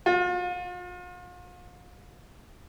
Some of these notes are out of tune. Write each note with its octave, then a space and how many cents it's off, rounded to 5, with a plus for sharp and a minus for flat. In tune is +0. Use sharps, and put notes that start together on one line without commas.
F4 +40